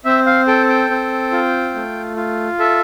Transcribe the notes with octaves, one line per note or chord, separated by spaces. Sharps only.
C4 E5
F5
A4 G5
G5
C4
F4
A3
F4
A4 E5